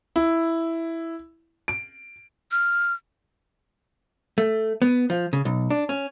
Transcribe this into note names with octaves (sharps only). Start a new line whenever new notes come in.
E4
D7
F6
A3
B3
F3
C#3
B1
D4
C#4